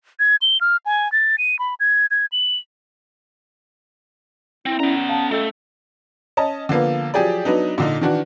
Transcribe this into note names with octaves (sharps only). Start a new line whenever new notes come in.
G#6
G7
F6
G#5
A6
D#7
B5
G#6
G#6
F#7
C4 E4
B3 C#4 D5 A#5
F5 A5
A3 F4 A4 D#5 G5
C#4 D#5 A5
D3 F3 A#3 B3
F3 F#3 G4 G#4 D5
F#3 B3 D4 D#4
A#2 D3 D#4
D#3 E3 D4 F#4